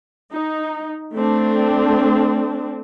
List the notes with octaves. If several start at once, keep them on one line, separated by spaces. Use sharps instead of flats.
D#4
A3 C4 D4